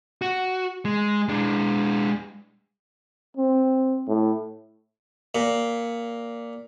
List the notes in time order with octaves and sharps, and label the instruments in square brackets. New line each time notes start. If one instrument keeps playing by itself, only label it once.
[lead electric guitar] F#4
G#3
G#3 D4
[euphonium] C4
A2
[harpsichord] A#2